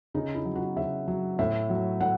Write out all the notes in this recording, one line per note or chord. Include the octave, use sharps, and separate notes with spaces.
C#3 D#4
E4
F#3
F#4
C#3 E5
F#3
A2 E5
F#3
A2 F#5